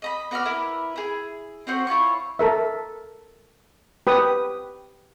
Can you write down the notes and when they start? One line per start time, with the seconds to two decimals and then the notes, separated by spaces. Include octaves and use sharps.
0.02 D#5 A#5 B5
0.31 B3 F#4 D5 F6
0.45 E4 A#4 B4
0.96 E4 G#4
1.67 C4 C#4 F#4 C5
1.87 E4 F4 C#5 C#6
2.39 A4 A#4 E5
4.07 G4 B4 D#6